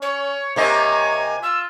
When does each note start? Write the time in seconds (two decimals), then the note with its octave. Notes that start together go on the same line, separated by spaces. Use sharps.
0.01 C#4 C#5
0.56 C3 A#3 C#5 D#5 G#5
1.42 F4 E6